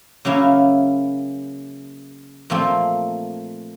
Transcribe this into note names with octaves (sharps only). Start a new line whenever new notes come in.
C#3 F#3 A#3 C#4 E4
A#2 F3 A3 C4